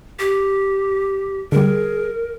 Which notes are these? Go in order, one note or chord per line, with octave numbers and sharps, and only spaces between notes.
G4
D3 G3 G#4 A#4